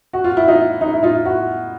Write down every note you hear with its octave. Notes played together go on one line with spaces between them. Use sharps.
F#4
F4
E4
D#4 F4
D#4
E4
D#4 F4
E4 F#4